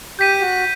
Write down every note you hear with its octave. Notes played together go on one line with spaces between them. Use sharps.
G4 G6 B6 D#7
F#4